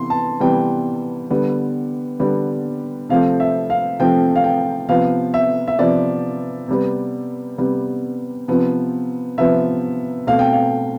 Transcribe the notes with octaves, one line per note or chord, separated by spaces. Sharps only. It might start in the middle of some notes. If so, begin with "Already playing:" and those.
Already playing: C3 E3 B3 C6
A5
C3 E3 G3 B3 G5
D3 G3 B3
D3 G3 B3
C3 F3 A3 C4 F5
E5
F5
C3 F3 A3 C4 G5
F5
G5
C3 F3 B3 F5
E5
E5
C3 F3 B3 D5
C3 G3 B3
C3 G3 B3
C3 F3 B3
C3 F3 B3 E5
B2 A3 C4 F5
G5
F5